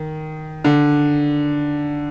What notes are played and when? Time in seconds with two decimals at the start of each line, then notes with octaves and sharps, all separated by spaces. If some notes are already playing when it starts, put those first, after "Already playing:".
Already playing: D#3
0.65 D3